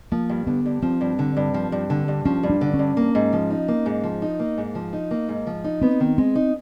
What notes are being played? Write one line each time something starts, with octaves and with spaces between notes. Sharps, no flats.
F3 A#3
G2
D3 B3
G2
F3 C4
G2
D3
G2
F3
G2
D3
G2
F3 C#4
G2
D4
D3
C#4
G2
A#3
G#2
F3
D#4
A#3
G#2
F3
D#4
A#3
G#2
F3
D#4
A#3
G#2
F3
D#4
B3 C4
D#3
G#3 C4
D#4